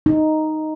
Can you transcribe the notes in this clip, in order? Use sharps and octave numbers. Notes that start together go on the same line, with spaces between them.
D#4